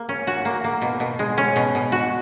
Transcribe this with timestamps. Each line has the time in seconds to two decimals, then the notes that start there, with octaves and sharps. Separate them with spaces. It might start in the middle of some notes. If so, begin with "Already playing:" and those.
Already playing: A#3
0.09 C#4
0.27 F#4
0.45 A#3
0.64 A#3
0.81 B2
1.00 B2
1.19 G#3
1.38 C#4
1.56 B2
1.75 B2
1.92 F#4